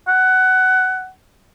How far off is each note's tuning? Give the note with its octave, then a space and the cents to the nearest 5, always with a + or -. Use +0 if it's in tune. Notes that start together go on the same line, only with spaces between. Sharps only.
F#5 +15